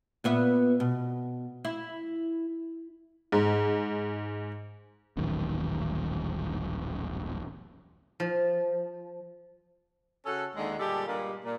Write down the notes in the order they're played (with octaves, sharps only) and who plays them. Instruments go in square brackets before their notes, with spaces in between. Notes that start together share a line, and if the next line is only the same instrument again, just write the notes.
[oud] A#2 B3 E5
B2
E4
[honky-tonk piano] G#2
[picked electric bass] D#1 A1 F#2 D#3
[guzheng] F3
[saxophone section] C#3 C#4 F#4 A4
D#2 D3 G#3
A#2 D3 G3 G#3 G4 A4
G2 A#2 G3 G#3 A#3
A#2